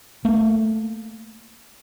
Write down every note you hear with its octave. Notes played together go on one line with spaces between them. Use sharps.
A3 A#3